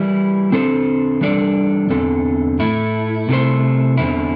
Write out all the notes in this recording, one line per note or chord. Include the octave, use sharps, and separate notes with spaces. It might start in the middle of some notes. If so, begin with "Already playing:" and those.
Already playing: E3 G3 E4
D3 C4 A4 C5
E3 G3 D4 A4 D5
E2 D3 C4 A4
A2 A3 E4
C3 A3 E4 C5
E2 D3 C4 E4